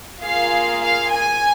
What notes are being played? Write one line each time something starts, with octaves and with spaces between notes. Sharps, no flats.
A#3 F4 G#4 F5
F5
G#5